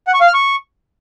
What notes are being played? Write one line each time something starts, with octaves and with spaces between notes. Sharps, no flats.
F#5
C#6
F5
F6
C#6